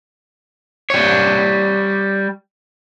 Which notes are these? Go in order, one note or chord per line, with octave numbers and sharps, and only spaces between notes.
G3 C#5